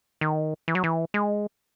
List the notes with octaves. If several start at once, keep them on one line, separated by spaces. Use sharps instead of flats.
D#3
E3
F#3
E3
G#3